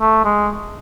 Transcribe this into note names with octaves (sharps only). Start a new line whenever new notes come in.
A3
G#3